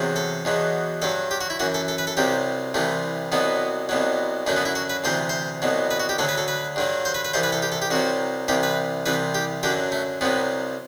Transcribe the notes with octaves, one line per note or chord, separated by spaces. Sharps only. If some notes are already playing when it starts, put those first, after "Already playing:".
Already playing: E2 C3 F#3
A4
E2 B2 F#3
G2 F#3 A4
G4
F#4
E4
F#2 E3 F#4
A4
A4
B4
A4
C2 C3 F#3 G4
C2 C3 E3 A3
C2 B2 F#3 B3
C2 B2 F#3
F#2 D3 F#3 A3
B3
E4
F#4
B4
D2 C3 E3 C5
C5
C2 B2 F#3
B4
F#4
G4
D2 D3 F#3 A4
B4
A4
B4
G2 D3 F#3
C5
B4
B4
C2 C3 E3 C5
B4
A4
G4
A4
G4
C2 C3 F#3 F#4
C2 C3 E3 G4
B4
C2 C3 E3 B4
G4
F#2 D3 F#3 G4
A3
C2 C3 F#3 B3